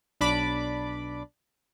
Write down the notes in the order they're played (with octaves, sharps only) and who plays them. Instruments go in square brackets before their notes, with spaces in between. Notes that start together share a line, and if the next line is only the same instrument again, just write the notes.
[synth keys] B1 D4 D5 B5 D6